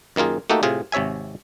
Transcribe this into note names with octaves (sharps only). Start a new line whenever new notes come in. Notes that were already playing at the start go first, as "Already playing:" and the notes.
F#2 D#3 A#3 F4 G#4
A3 A#3 D#4 F#4 G4 A4
A2 C3 F4 G#4
G#1 C3 C#5 E5 G#5